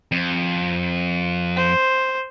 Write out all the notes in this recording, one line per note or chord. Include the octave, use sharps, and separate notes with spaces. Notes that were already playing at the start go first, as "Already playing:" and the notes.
F2
C5